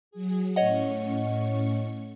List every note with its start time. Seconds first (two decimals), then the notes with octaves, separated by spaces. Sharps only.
0.11 F#3 G#4
0.56 A2 C#4 C#5 D#5 F#5 C#6